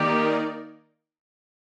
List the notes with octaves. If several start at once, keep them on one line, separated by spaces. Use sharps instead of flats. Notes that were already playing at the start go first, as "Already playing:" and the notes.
Already playing: D#3 A#3 D#4 G4 A#4 D5